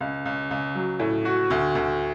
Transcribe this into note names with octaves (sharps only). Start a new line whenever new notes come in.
C#2
C#2
C#2
F#3
A2
F#4
D2
D2